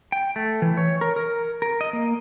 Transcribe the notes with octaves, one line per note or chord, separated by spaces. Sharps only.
G5
A3
E3
C#5
A#4
A#4
A#4
D#5
A#3